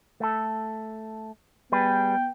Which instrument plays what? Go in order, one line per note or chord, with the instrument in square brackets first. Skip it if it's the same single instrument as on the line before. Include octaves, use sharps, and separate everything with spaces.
[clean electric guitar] A3 A4
[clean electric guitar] G3 G#4 B4 [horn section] B3 G5